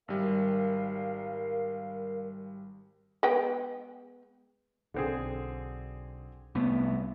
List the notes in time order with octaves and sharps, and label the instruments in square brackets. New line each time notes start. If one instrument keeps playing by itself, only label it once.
[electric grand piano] G#1 G3 [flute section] A#4 F5
[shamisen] G#3 B3 G5
[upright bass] B1 [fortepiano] D3 C4 G#4
[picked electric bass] C2 A3 B3